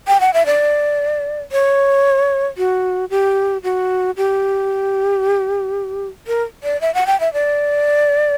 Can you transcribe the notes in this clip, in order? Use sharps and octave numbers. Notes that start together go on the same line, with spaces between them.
G5
F#5
E5
D5
C#5
F#4
G4
F#4
G4
A#4
D5
E5
F#5
G5
E5
D5